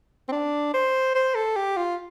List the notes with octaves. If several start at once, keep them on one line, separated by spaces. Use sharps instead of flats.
C4
D4
C5
C5
A4
G4
F4